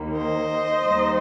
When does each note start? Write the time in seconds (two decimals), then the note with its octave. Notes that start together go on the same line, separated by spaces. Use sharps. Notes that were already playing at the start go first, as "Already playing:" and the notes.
Already playing: D#2 D#3 A#3
0.17 C5 D#5
0.84 D#2 D#3 G3 A#3 D#4